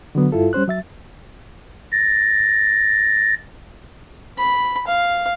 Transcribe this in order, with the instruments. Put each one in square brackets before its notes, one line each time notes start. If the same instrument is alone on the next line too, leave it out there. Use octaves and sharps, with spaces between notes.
[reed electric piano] D3 F#3 B3
G2 E4 F4 A4
G3 C#4 C5 F#6
F#3 E5 A6
[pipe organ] A6 A#6
[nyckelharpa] B5
F5